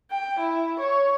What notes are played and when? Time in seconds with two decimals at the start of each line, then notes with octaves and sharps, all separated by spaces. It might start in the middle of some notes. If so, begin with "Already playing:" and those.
0.11 G5
0.39 E4
0.80 C#5